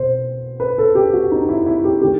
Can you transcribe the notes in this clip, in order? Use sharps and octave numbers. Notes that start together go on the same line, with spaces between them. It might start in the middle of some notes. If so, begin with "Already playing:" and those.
Already playing: B2 C5
B4
A4
G4
F#4
D#4
E4
E4
G4
D#3 A3 G4